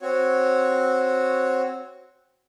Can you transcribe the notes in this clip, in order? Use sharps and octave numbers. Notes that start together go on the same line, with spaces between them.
C4 F#4 C#5